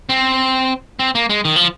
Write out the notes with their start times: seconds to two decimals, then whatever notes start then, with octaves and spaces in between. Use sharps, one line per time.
0.09 C4
0.99 C4
1.15 A#3
1.30 G#3
1.45 D#3
1.56 F3